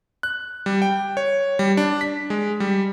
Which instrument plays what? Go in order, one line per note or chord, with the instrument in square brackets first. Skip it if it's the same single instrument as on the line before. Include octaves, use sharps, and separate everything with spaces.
[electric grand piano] F#6
G3
G5
C#5
G3
D4
B6
G#3
G3